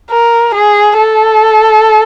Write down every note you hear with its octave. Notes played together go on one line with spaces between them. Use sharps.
A#4
G#4
A4